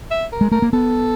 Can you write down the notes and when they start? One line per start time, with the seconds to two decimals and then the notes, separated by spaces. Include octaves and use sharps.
0.11 E5
0.32 A#4
0.41 G#3
0.51 A3 A#4
0.62 A#3
0.73 B3 A4